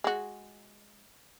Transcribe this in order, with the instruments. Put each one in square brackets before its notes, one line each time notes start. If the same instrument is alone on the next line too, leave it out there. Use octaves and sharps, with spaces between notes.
[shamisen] G#3 F#4